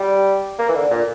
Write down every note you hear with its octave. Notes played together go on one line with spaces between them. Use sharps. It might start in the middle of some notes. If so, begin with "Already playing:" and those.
Already playing: G3
A#3
E3
D3
A#2